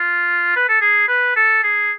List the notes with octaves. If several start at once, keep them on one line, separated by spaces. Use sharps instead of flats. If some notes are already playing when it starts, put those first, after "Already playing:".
Already playing: F4
B4
A4
G#4
B4
A4
G#4